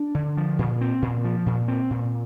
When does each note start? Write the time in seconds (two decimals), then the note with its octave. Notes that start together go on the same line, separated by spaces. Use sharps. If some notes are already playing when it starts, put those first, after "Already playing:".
Already playing: D4
0.15 D3
0.37 F3
0.59 A#2
0.81 C4
1.02 A#2
1.24 F3
1.46 A#2
1.68 C4
1.91 A#2